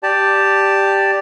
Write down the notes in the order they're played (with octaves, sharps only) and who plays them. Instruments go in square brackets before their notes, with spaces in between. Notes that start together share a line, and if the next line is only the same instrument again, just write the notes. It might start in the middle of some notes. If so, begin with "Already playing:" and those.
[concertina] G4 D5 A5